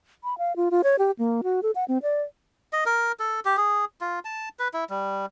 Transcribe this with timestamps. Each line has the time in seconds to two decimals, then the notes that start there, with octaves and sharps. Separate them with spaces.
0.24 B5
0.38 F5
0.56 F4
0.71 F4
0.84 C#5
0.99 G4
1.19 A#3
1.43 F#4
1.63 A4
1.75 F#5
1.88 C4
2.03 D5
2.73 D#5
2.86 A#4
3.20 A4
3.45 G4
3.57 G#4
4.01 F4
4.25 A5
4.59 B4
4.74 E4
4.90 G3